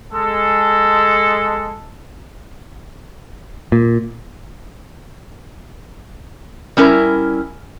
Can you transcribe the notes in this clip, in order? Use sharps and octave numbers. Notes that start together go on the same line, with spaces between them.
G#3 A4
A#2
G3 C#4 E4 A#4